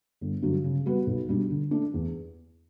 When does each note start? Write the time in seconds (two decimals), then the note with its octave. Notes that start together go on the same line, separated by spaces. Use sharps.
0.21 G1
0.42 G2 D3 F#3
0.64 C#3
0.86 G3 B3 F#4 B4
1.07 B1
1.29 B2 G3 D4
1.50 D3
1.71 A3 D4
1.94 E2